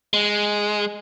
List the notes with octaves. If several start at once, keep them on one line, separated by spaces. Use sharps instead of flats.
G#3